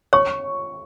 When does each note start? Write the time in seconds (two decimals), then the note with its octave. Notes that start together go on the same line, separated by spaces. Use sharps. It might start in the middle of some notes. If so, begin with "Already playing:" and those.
0.13 C#5 C#6